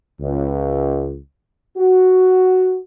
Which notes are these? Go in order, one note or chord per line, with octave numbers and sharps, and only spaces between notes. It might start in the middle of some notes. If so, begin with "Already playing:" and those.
C#2
F#4